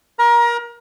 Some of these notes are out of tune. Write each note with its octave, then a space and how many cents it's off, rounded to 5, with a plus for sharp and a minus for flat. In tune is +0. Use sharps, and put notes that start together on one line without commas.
A#4 +25 A#5 +30